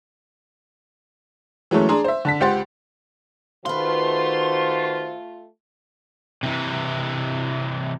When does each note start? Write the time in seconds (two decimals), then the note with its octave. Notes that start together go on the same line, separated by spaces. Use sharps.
1.71 E3 F#3 G#3 A3 C#4
1.89 D4 G#4 A#5 C6
2.04 C5 E5
2.25 D3 A5 B6
2.41 C#2 G4 C5 F#5 C6 A6
3.66 D#3 A3 F4 F#4 B4 C5 F5 C6
6.43 C3 E3